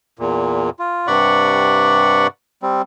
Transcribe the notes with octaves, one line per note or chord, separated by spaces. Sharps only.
E2 A#2
F4
G2 C3 D5 F#5 B5 C#6
G3 C4